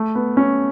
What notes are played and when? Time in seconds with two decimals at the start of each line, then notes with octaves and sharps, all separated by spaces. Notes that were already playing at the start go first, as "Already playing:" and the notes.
Already playing: A3
0.15 B3
0.37 C#4